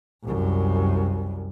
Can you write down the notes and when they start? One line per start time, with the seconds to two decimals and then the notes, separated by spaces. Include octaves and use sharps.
0.24 C2 F#2